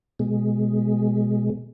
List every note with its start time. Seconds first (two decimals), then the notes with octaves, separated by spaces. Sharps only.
0.19 B2 G#3